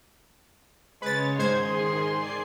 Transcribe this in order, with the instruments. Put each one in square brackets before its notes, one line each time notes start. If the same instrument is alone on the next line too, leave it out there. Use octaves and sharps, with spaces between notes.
[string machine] C#3 C#5 [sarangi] G#3 [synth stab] B4 A6
[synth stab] G#2 C5 G#6 [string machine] D#3 G#4 [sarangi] C6
[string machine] D5 G#5 C7